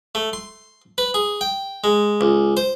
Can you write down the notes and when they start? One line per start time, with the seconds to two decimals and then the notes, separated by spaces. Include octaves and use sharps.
0.15 A3
0.33 C6
0.98 B4
1.14 G#4
1.41 G5
1.84 G#3
2.21 C#2
2.57 C5